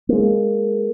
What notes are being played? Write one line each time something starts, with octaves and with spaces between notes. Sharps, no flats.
G#3 A#3